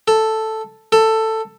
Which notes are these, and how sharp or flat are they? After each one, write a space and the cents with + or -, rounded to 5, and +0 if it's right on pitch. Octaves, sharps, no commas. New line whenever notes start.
A4 +0
A4 +10